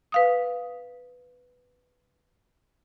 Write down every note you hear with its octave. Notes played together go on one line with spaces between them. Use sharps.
B4 F5 D#6